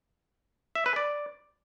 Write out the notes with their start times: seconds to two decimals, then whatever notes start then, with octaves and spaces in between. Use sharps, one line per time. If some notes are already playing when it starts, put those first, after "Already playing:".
0.75 E5
0.86 B4
0.96 D5